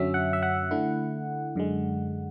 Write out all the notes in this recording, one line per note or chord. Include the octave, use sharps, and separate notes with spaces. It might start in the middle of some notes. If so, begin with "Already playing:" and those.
Already playing: F#2 D3 F#3 C#4 E5
F#5
E5
F#5
D3 A3 E4
F#2 D3 G#3